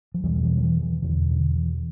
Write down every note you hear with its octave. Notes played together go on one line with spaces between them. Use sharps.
F3
E2 B2 E3 G3
E3 G3
F3
E3
E3
E2 B2 D3
D3
E3